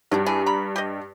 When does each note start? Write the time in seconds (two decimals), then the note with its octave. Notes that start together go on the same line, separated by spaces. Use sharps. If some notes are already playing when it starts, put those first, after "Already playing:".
0.12 G2 F#3 G3 D4
0.26 D4 E4 G#4
0.46 A#5 B5
0.76 G4 D#5